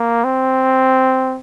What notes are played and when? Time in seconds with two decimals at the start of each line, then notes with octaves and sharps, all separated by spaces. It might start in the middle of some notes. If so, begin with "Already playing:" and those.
Already playing: A#3
0.24 C4